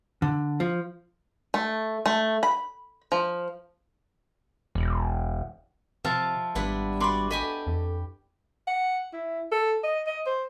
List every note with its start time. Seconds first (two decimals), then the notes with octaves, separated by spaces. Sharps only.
0.22 D3
0.60 F3
1.54 A3
2.06 A3
2.43 B5
3.12 F3
4.75 E1
6.05 C3 F3 E5 F5 A5
6.55 G#1 G3 B3 D4 E4
7.00 F#4 D5 B5 C6 D6
7.31 G4 A4 D#5 G#5 B5
7.66 F2
8.67 F#5
9.13 E4
9.52 A4
9.84 D#5
10.07 D#5
10.26 C5